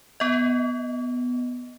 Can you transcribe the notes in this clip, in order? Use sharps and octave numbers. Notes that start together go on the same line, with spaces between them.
B3 D#5